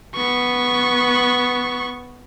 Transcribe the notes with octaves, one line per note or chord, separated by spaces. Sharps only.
B3 C#6